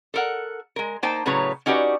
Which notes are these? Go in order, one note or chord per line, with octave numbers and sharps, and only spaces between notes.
A4 A#4 F#5
G#3 A#4
A#3 D#4 C5 G5 A5
A2 C#3 F#3 B4 C#5 A#5
C#4 D#4 F#4 G4 B4 D5